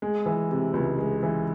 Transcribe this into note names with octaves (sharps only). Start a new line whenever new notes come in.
G#3
E3
C3
C#2
G#3
E3